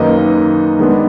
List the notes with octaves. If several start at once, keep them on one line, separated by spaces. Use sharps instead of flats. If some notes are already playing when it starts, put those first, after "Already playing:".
Already playing: F#2 D#3 A#3 D#4 B4 D#5
D#3 G#3 B3 D4